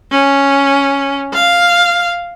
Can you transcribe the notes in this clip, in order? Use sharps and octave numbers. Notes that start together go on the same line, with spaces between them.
C#4
F5